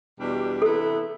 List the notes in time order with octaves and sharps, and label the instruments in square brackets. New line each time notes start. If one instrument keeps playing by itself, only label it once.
[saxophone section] E2 B2 G3 D4 G4
[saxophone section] C3 E3 B3 E4 [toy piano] A4